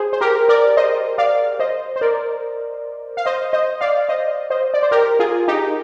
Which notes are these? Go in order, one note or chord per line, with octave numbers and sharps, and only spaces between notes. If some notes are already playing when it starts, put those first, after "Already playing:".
Already playing: G#4 C5
C5
G4 A#4
A#4 D5
C5 D#5
D5 F5
C5 D#5
C5
A#4 D5
F5
C5 D#5
C5 D#5
D5 F5
C5 D#5
C5 D#5
D5
C5
G4 A#4
F4 G#4
D#4 G4